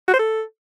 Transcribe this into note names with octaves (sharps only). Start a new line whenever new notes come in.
F#4
C5
A4